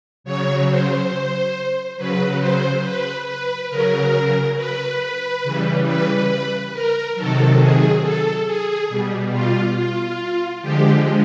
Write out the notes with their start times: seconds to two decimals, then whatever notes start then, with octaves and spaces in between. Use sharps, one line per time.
0.24 C#3 F#3 C#5
0.68 C5
1.97 C#3 F#3 B4
2.40 C5
2.83 B4
3.27 B4
3.70 C#3 F#3 A#4
4.56 B4
5.44 C#3 E3 G3
5.86 B4
6.73 A#4
7.15 C3 D#3 F#3 A4
7.59 G#4
8.02 A4
8.46 G#4
8.89 B2 G3
9.32 F4
9.75 F4
10.62 D3 F3 G#3 G4